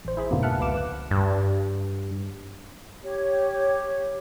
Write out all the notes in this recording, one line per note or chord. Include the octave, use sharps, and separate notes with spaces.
A1 C5
E4 G#4 B5
F2 G#2 B2 D3 A#3 B3
E5 F#5 A5 F6 F#6 C#7
C#2 B4 F5 D6 E7
F#6
G2
G4 C#5